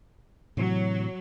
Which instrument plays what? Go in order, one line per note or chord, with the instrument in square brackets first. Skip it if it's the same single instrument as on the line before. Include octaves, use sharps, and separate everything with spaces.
[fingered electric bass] A2 C3 E3 [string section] F#3